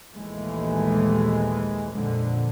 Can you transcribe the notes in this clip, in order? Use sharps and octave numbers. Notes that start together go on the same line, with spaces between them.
A#1 D#2 E3 G#3 A3
F2 A#2 D3